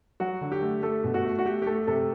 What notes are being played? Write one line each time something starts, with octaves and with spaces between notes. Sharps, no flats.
F#3 F#4
D3
G4
A3
A3 A4
B2
F#4
A3
F#4
A3 G4
G4
A3 A4
C3 A4